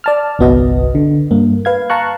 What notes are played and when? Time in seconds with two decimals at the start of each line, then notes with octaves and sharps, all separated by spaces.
0.04 D5 A5 F6
0.39 G1 C2 B3 F#4 D#5
0.95 D3
1.31 G2 A#3
1.65 B4 F5 G#6
1.90 F5 A5 A#5 C#6 F#6